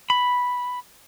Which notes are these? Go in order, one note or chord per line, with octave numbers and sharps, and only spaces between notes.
B5